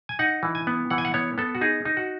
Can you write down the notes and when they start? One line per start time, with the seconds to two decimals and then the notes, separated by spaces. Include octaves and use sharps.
0.09 G#5
0.19 D#4 F#5
0.43 E3
0.55 G#5
0.67 B3
0.91 E3 F#5
0.98 G#5
1.05 F#5
1.14 B3 C#5
1.38 B3 A4
1.55 F#4
1.61 D#4 G#4
1.85 D#4
1.97 F#4